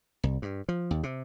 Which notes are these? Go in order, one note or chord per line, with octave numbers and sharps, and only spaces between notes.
C2
G2
F3
D#2
C3